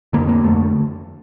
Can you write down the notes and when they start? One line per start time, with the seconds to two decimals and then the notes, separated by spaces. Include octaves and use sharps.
0.13 F2 D3 A#3
0.29 A#3
0.44 F2 D3 A3